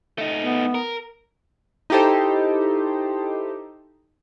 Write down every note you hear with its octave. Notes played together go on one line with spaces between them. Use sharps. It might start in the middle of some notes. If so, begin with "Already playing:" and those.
A3 D#4
B3
A#4
D#4 E4 G4 A4 C5